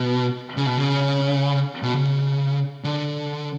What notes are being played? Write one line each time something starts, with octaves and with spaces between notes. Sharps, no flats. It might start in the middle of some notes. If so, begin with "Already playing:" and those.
Already playing: B2
C#3
B2
C#3
B2
C#3
D3